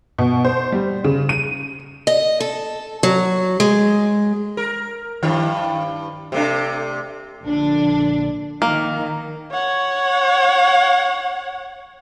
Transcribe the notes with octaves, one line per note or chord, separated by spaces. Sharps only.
B2
C5
G3
C#3
D#7
D#5
A4
F#3
G#3
A#4
G2 D#3
C3 A3 D4
A#1 D3 D4
D#3 A#3
C#5 F#5